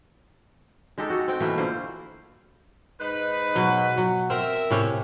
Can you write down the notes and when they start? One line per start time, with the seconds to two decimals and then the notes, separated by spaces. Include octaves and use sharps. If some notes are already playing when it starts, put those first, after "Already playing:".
0.98 G#3 D#4 G4 A4
1.10 F#4 A4
1.28 C4 G5
1.40 B2 E3 A3 A#3
1.57 D3 A#3 F4 C5
3.00 G#2 D#4 B4
3.56 B2 F#3
3.98 F#3
4.30 C4 A#4 E5
4.70 A2 C3 C#4